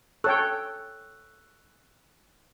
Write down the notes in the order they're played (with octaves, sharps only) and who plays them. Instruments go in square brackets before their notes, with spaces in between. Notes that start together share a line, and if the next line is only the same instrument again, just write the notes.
[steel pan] A4 C#5 G5 [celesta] C#6 E6 F#6